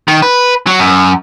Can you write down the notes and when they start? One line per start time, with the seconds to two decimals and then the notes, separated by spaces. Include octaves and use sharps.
0.08 D#3
0.22 B4
0.67 F#3
0.79 F#2